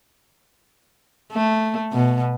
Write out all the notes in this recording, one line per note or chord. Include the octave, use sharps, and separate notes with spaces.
A3
B2